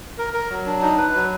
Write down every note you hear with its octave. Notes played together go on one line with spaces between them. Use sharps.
A#4
A#4
F#3
D4
D#4
B4
F#3